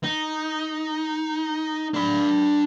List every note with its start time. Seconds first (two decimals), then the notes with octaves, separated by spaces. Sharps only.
0.04 D#4
1.94 D4 B5